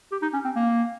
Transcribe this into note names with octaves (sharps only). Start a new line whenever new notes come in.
G4
D#4
C#4
C4
A#3